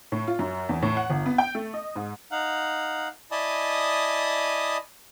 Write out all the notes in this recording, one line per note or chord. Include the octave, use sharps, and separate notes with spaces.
A2
F4
F#2
E2
A2
F#5
G1
B3
G5
A3
D#5
G#2
D#4 F5 F#5
E4 D5 D#5 G#5 A5 D#6